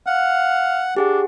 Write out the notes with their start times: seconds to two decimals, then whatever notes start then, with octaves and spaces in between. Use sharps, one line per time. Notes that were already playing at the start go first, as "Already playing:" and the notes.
0.07 F5 F#5
0.97 D4 G4 G#4 F#5